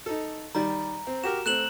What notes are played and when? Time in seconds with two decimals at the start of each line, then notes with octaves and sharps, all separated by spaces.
0.06 D#4 A4
0.55 D#3 G3 D5 A#5
1.07 C4
1.24 F#4 G4 A#4 E7
1.46 A3 C4 F#6 E7 F#7